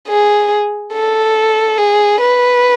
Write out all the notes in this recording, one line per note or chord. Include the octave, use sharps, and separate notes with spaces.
G#4
A4
G#4
B4